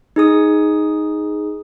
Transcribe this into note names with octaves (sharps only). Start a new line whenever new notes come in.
D#4 G#4 D#6